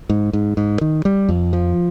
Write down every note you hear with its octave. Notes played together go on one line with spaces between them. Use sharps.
G#2
G#2
G#2
D#3
G3
F2
F3